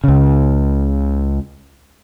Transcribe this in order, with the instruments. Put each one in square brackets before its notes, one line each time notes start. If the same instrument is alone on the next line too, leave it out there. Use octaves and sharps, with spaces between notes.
[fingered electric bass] C#2 C#3